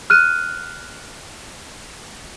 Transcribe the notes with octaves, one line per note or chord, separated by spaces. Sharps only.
F6 F#6 D#7